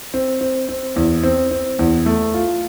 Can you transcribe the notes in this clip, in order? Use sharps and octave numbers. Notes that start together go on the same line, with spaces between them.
C4
C4
C4
E2
C4
C4
E2
A3
F4